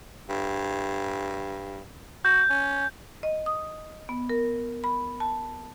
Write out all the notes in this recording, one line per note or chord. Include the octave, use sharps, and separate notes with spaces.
G2
F#4 G6
C#4
D#5
D#6
B3
A#4
B5
A5